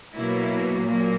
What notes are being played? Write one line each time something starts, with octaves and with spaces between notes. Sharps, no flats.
B2 F#3 A#3 E4
A#2 F#3 A#3